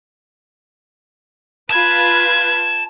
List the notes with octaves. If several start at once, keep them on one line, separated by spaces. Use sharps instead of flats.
F4 B4 A5 G#6